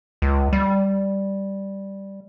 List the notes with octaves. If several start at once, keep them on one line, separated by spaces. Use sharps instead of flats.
C#2
G3